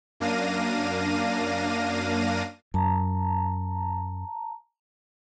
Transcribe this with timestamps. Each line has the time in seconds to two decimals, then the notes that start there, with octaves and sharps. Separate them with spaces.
0.20 F#2 A#3 D4 F5 A#6 D#7
2.74 F#2 A5 A#5